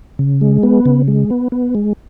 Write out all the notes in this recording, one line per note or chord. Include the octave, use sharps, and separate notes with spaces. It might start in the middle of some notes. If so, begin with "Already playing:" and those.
C#3
G#3
B3
C#3
G#3
B3
B3
G#3